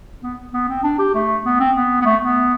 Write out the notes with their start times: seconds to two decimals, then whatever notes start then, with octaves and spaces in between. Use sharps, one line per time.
0.22 B3
0.53 B3
0.68 C4
0.83 D4
0.99 G4
1.14 A3
1.45 B3
1.60 C4
1.75 B3
2.01 B3
2.05 A3
2.22 B3